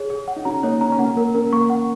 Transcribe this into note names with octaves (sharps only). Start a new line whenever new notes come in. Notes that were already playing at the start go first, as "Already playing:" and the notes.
Already playing: G#4 C#5
G#4
F#5
D#4
C#4 F#4 A#5
A#3 D#4 C#5
C#4 A#5
C#4
A#3 F#5
A#3 A#4
C#4 A#4
A#3 C#6
F#5